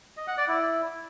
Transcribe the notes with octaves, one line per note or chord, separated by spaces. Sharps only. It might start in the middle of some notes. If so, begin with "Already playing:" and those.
D#5
F#5
D5
E4